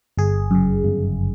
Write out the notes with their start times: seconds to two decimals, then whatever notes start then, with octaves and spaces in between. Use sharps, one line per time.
0.17 G1 G#4
0.51 F#2 C#3
0.85 G1